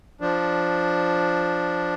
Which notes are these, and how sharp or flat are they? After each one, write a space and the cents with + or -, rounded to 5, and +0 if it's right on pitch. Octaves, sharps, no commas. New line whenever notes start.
F3 +0 D4 +0